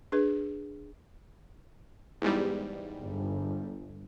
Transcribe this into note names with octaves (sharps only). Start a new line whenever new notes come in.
D4 G#4 B4
E2 G#2 G3
G1